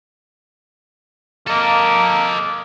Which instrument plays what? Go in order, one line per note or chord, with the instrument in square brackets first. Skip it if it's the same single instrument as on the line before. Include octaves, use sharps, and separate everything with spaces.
[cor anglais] A#3 [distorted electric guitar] A4 D#5